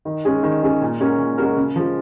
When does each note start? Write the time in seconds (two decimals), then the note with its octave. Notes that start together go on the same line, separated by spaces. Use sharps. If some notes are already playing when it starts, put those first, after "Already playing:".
0.05 D#3
0.25 G#3 C#4 G#4
0.43 D#3
0.63 G#3 C#4 G#4
0.82 A#2
1.00 G#3 C#4 F#4 A#4
1.19 A#2
1.38 G#3 C#4 F#4 A#4
1.56 C#3
1.76 F3 G#3